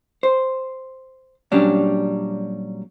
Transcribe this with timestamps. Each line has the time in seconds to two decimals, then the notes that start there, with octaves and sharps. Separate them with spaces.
0.23 C5
1.52 A#2 F#3 G3 C#4 D4